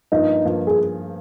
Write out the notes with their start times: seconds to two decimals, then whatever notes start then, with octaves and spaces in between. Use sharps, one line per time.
0.12 G2 F3 A#3 D#4
0.45 G2 F3 A#3
0.67 G#4